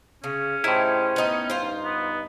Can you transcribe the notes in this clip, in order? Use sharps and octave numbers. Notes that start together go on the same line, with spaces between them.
C#3 C#4
A2 D#4 E4 G4 G#4 C5
B3 D#4
G2 D#4 F4 C5
B3